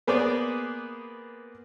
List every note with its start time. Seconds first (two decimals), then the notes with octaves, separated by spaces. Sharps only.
0.07 A#3 B3 G#4 B4 C5 D5